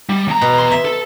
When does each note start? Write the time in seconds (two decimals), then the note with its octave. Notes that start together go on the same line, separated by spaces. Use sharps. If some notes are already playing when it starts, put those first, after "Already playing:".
0.09 G3
0.28 E2 A#5
0.41 B2
0.58 C6
0.71 E5
0.85 A4